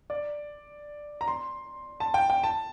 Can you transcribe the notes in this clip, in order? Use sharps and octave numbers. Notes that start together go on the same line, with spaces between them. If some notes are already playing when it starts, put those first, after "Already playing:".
D5
A#5
C6
A5
G5
G5
A5